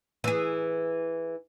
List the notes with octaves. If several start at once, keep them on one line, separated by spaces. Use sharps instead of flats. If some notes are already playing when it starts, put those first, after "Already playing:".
E3 G#4